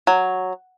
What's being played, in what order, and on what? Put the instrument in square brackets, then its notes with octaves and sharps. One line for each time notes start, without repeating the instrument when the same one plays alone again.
[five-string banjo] F#3